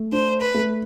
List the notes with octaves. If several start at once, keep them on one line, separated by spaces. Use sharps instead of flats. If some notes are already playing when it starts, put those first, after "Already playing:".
Already playing: A3
D4 C5
B4
A3